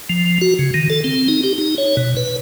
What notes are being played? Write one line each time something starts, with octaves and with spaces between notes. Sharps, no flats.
F3
F#4
C#3
D#3
A4
C4
D#4
G4
D#4
C#5
B2
B4